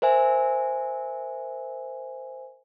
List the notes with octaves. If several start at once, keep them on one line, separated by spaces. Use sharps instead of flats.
A#4 C5 E5 G#5